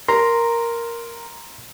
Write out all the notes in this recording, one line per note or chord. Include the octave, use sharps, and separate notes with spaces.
A#4 A#5 C6